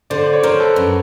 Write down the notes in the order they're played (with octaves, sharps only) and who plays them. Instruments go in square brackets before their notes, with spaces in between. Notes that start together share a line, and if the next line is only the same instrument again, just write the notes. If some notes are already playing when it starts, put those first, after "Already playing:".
[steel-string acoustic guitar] D3 [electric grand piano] C5 D5
[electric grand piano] D5
C#5
[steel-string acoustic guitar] D3 [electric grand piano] A#4 C5
[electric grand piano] A4 B4
[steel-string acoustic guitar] F#2